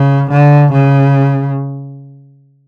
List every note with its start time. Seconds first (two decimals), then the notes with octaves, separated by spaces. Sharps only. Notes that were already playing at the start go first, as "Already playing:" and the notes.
Already playing: C#3
0.31 D3
0.72 C#3